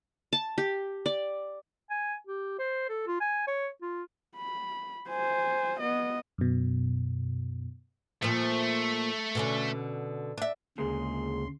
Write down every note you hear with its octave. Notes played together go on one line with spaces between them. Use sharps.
A5
G4
D5
G#5
G4
C5
A4
F4
G#5
C#5
F4
B5
C5 G#5
B3 D#5
F#2 B2
A#2 F3 A3
B2 D3 C#4
D4 E5
D2 A#2 C#3 G#3 G#4 C6